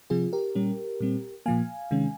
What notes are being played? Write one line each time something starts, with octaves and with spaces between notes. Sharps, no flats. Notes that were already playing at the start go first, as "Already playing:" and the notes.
C3 F3 C4 F4 G#4
G4 A#4
A#2 G3 C#4
A#2 G3 C4
A#2 F3 A#3 F5 G#5
C3 D#3 G#3 C#4